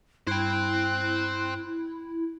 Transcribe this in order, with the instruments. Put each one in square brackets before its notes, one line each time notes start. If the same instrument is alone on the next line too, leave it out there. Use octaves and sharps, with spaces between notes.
[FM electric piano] G2 [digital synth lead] E4 [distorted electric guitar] C5 G5 [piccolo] F#6